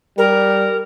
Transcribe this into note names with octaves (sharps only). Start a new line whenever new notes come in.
G3 A#4